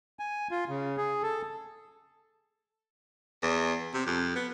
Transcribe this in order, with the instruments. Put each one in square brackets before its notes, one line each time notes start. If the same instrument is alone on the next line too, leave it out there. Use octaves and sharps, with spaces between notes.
[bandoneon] G#5
F4
C#3
G#4
A4
[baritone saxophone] E2
C3
F2
B3